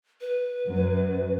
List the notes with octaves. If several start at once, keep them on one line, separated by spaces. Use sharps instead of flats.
B4
F#2 F#3